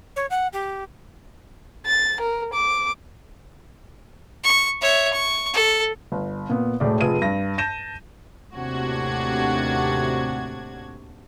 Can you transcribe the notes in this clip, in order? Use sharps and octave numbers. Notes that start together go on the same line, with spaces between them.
C#5
F#5
G4
A6
A#4
D6
C#6
C#5 E5
C#6
A4
G1
A#2 B3
E1 A2 D5
F1 F4 G#4 B4 D#7
G2 A#6
A5 G6 A#6 D#7 E7
D#2 A2 C3 D4 F#4 G#6